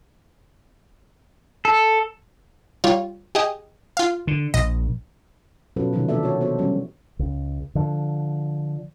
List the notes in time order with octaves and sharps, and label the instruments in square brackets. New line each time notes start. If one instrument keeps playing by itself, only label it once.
[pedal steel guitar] A4
[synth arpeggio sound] G3 F4 C#5
G4 G#4 D#5
F4 F5
[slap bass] D3
[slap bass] A#1 [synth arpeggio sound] D#5
[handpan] B2 F#3 C#4 F4 A4 B4
C3 D#3 F3 F#3
E3 A#3 D4 A4 D5 E5
F#4 C#5
B3 F#4 A4 C5 C#5
E3 F#3 G3 C#4
[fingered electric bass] C#2
D3 F3